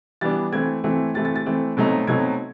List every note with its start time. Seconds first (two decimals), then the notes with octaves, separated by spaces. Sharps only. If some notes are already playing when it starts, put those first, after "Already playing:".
0.21 E3 G3 B3 D4 A6
0.52 E3 A3 C4 G#6
0.84 E3 A3 C4
1.14 E3 A3 C4 A6
1.25 A6
1.36 A6
1.46 E3 A3 C4
1.77 B2 F#3 A3 C4 D#4
2.07 B2 F#3 A3 C4 D#4 G#6